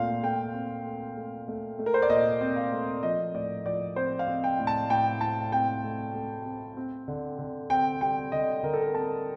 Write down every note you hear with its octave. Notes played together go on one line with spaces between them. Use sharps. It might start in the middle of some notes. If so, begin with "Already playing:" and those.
Already playing: A#2 A3 C4 F5
A3 G5
C4
A3
A3
A3
A3
A#4
C5
D5
A#2 D#5
C4
F5
A3
F3 D#5
A2 D5
F3 D5
C4 C5
F5
C4
G5
A2
A5
A2 G5
A2 A5
C4 G5
A3
A3
C4
C4
D3
D3
C4 G5
G3 G5
D3 D#5
D3 A#4
A4
A#4
C4 A5